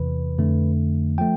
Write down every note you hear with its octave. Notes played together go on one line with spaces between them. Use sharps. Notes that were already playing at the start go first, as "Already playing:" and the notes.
Already playing: E2 C3 E3 B4
F2 D3 A3
F3 A3 G5